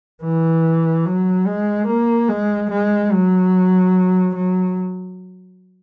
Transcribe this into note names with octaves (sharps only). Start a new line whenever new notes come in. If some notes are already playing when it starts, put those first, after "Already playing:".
E3
F#3
G#3
A#3
G#3
G#3
F#3
F#3